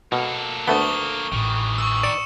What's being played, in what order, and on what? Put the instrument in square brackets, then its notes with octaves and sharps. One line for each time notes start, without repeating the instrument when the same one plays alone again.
[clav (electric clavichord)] B2 [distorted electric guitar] A#3 A4
[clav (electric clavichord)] D2 A3 B3 [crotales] C#6 D#6 G7
[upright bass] A1 [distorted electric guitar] D#3 E3
[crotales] C#6 E6
[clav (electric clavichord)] D5 [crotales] C#7 E7